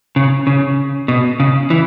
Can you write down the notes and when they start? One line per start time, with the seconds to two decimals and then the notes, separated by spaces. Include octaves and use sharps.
0.16 C#3
0.47 C#3
1.08 B2
1.40 C#3
1.70 E3